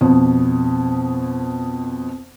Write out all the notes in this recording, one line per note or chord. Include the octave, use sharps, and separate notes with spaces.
F2 B2